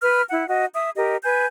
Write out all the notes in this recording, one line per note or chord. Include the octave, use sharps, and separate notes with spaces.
B4 B5 F6
E4 F#5
F#4 D#5
E5 D#6
G4 A#4 D#5
B4 G#5 G6